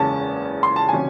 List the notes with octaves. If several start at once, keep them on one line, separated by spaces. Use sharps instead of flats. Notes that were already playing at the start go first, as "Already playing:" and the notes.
Already playing: F#1 E2 C#3 G#3 C#4 A5
C6
A5
C3 D#3 F#3 C#4 G#5